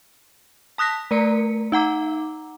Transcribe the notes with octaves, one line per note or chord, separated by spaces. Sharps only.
A5 D#6 F#6 A#6 B6
A3 A#4 D5 A#5 C#7
D#4 F#5 A#5 D6